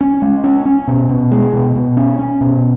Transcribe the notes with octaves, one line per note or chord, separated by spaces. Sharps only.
C#4
G#3
C#4
C#4
B2
B2
G#3
B2
B2
C#4
C#4
B2